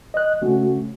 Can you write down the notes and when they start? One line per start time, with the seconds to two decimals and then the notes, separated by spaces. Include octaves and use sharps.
0.14 D#5 F#6
0.41 C#3 A3 C#4 F#4